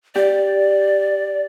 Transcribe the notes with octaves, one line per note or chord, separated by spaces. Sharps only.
G4 D5